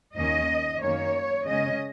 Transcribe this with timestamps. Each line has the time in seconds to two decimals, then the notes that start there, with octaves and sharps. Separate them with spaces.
0.16 D#2 D#3 A#3 C#4 D#5
0.81 F#2 D#3 A#3 C#4 C#5
1.46 C#3 G#3 C#4 D#5